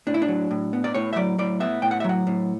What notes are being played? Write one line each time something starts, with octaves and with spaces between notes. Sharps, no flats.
A2 D4
E4
D4
F#3
A2
B3
D5
A2 C#5
E5
F#3 D5
A2 D5
B3 E5
A2 G5
F#5
E5
F#3 F#5
A2